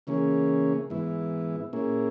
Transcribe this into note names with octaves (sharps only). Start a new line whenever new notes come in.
C#3 E3 A#3 C#4 G#4
G#2 E3 B3 E4
A#2 A#3 C#4 E4 G#4